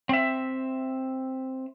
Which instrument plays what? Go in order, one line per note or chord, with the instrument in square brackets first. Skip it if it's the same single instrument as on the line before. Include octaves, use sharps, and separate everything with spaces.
[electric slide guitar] C4 E5